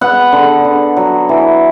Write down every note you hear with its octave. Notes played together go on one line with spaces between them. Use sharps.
B3 F#5
D3
D3
F#3
E3